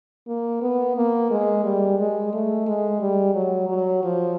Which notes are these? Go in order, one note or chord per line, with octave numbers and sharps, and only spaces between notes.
A#3
B3
A#3
G#3
G3
G#3
A3
G#3
G3
F#3
F#3
F3